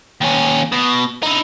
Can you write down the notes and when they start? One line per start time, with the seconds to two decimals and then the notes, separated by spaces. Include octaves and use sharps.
0.21 D#2 C#4
0.72 B2
1.23 D#4 E4